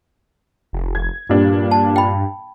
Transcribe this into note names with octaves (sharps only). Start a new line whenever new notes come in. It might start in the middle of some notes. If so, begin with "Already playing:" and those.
F1
G#6
G2 A#2 G3 D4
A5
G5 B5